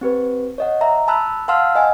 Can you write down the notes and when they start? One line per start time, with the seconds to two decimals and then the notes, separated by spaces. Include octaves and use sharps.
0.01 C4 G4 B4
0.58 C#5 D#5 F#5
0.81 E5 A#5
1.08 A5 B5 E6 F#6
1.48 F5 F#5 A5 C6 E6 F6
1.75 D#5 F#5 G#5